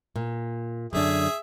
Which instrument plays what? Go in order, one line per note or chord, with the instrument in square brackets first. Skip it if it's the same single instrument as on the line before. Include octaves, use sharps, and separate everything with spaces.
[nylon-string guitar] A#2
[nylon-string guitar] F#2 D3 D4 [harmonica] G#4 E5